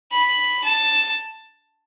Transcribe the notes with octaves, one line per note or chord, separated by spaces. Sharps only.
B5
A5